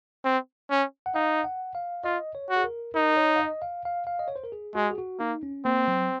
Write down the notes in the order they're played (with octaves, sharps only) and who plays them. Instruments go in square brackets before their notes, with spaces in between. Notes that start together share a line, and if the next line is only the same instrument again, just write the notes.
[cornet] C4
C#4
[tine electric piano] F#5
[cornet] D#4 [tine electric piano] F5
[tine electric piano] F#5
F5
[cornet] F4 [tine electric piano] D#5
[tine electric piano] C#5
[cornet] F#4
[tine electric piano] G#4
A#4
[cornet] D#4 [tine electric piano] A#4
[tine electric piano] C#5
F5
D#5
F5
F5
F5
D#5
C#5
C5
A#4
G#4
[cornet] G#3 [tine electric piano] F#4
[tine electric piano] G#4
F#4
[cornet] A#3 [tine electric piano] D#4
[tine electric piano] C#4
[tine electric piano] A#3 [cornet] C4
[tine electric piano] F#3